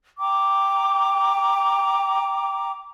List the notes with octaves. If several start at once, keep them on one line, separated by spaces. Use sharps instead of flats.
G5 A#5 D6